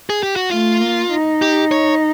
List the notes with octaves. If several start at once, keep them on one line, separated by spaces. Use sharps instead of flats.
G#4
G4
F#4
A3 F4
A#3
D#4
G4
C#5